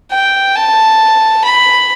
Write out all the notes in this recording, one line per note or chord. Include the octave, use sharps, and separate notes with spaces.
G5
A5
B5